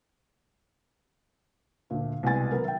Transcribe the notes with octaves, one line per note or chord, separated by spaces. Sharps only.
D2 A#2 A3
C2 B2 G#3 B3 G#5 A6
D#3 F#3 B3 A#4 B4
E5 G5